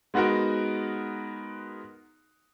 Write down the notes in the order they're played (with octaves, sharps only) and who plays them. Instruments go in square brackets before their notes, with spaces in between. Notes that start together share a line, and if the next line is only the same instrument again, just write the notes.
[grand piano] G#3 B3 D#4 F#4 A#4